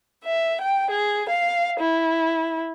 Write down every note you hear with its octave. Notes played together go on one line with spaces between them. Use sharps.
E5
G5
G#4
F5
E4